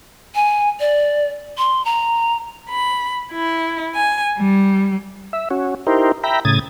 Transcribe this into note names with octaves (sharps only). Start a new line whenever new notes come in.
G#5
D5
C6
A#5
B5
E4
G#5
G3
E5
C#4 F#4
D#4 E4 G4 A#4 C5
E5 G5 A#5 B5
A2 C#3 D#6 G#6 A6